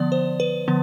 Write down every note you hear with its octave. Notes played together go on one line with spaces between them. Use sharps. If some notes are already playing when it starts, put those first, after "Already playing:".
Already playing: D3 F3 B3 D5
C5
B4
D3 F3 B3